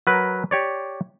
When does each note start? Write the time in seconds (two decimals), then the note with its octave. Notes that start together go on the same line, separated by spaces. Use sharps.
0.07 F#3 A#4 B4
0.51 G4 C#5 D5